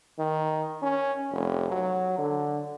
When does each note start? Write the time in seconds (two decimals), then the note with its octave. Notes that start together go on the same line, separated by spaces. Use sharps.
0.19 D#3
0.82 C#4
1.32 F1
1.71 F#3
2.18 D3